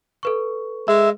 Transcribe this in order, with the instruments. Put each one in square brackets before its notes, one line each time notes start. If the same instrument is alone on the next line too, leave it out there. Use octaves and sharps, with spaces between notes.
[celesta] A4 B4 C#6
[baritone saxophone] G#3 [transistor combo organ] E5